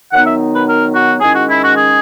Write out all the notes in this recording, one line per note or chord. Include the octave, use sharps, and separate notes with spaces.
D#3 F#3 B3 D#4 F#5
E5
B4
A#4
F#4
D#3 G#3 C#4 E4 G#4
F#4
E4
F#4
G#4